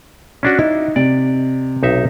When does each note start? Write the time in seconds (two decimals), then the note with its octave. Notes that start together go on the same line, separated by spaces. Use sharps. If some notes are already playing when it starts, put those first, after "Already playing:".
0.43 C#4 D4 F#4
0.59 D#4 E4
0.96 C3 D5
1.83 B1 D#4 E5